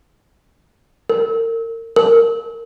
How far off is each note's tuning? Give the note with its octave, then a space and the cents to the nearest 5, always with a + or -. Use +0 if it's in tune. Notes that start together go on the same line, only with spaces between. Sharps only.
A#4 -35
A#4 -10